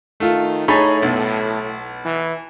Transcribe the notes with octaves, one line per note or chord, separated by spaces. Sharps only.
D#3 A3 F4
A2 D#4 G#4 C#5 A5 B5
B1
E3